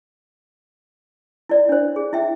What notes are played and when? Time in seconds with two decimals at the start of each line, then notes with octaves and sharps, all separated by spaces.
1.49 E4 D5
1.69 D4 C5
1.96 G#4
2.13 E4 E5 G5